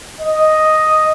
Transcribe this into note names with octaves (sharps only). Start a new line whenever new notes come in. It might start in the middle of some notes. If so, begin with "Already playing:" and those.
D#5